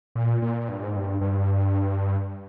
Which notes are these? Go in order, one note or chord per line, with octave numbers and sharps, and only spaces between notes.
A#2
A#2
G2
G#2
G2
G2